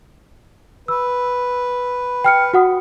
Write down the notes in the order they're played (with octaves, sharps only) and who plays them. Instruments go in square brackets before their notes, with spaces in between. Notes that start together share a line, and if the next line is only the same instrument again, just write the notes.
[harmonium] B4 [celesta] E6
[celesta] G5 F6 C#7
F#4 F#5 D#6